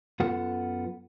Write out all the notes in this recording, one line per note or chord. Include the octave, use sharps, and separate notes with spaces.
F#2 B3 F4 A4 F#5